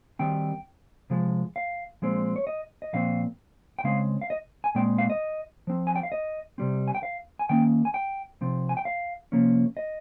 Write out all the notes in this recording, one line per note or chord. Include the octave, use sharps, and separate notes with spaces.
D#3 G3 C4 G5
C3 F3 G#3
F5
A#2 F3 G#3 C4
C#5
D#5
D#5
A#2 F3 C4 F5
G5
C#3 G#3 C4 F5
F5
D#5
G#5
A#2 G#3 C4 G5
F5
D#5
F3 C4
G#5
G5
F5
D#5
C3 G3 C4
G#5
G5
F5
G#5
D#3 A#3 C#4 G5
G#5
G5
C3 F3 C4
G#5
G5
F5
C3 F3 A#3 C#4
D#5